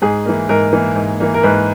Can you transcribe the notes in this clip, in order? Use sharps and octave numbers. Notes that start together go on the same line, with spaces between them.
G#2 G#4
E3 A#3
G#2 A#4
E3 A#3
G#2
E3 A#3
A#4
G#2 B4